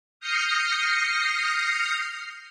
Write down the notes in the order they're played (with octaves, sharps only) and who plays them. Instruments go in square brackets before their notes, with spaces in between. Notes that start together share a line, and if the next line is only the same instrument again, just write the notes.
[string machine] D#6 F6 G6 A#6 C7 C#7